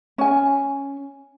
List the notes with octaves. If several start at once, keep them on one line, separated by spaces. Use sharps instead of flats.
C#4 G#5